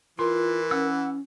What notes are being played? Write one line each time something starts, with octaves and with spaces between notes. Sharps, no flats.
E3 F4 A#4 C6
C#4 F#5 E6